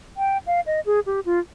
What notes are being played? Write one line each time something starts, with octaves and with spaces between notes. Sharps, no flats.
G5
F5
D#5
G#4
G4
F4